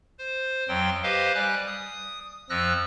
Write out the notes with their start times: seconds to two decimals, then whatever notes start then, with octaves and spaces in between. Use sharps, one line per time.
0.19 C5
0.68 F2 F#3 G5 C6
1.03 G4 B4 C5 D#5 F5
1.35 G3 G#5 F#6
1.67 D#6
2.50 F2 F3 E6 F#6 A#6